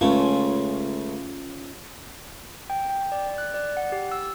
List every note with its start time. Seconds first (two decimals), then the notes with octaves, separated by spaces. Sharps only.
0.01 C#2 C#3 A3 C#4 F4
2.70 G5
2.90 G5
3.12 D5
3.38 F#6
3.54 D5
3.77 F#5
3.92 G4
4.12 E6